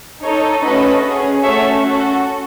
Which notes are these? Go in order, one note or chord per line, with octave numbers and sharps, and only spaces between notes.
D#4 A4 C#5
A3 C#4 F#4 A4 B4 D#5
C#4 G#4
A3 C#4 F#4 A4 C#5 E5
C#4 F#4 A4